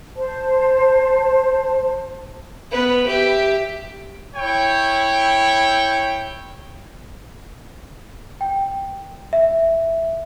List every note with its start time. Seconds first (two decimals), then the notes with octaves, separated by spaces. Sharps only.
0.16 C5 A5
2.72 B3 B4
3.06 G4 E5
4.36 E4 C#5 G5
8.41 G5
9.33 E5